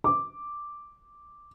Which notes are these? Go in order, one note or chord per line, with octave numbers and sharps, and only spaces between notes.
D6